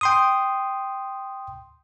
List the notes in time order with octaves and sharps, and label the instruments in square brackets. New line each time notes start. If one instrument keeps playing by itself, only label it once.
[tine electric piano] G5 C6 D#6